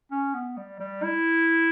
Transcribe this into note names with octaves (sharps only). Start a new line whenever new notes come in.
C#4
B3
G3
G3
E4